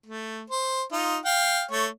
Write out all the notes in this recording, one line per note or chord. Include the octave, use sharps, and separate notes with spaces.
A3
C5
D#4 F4
F5 G5
A3 C#5